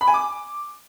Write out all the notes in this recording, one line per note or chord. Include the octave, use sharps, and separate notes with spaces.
B5
G#5
D6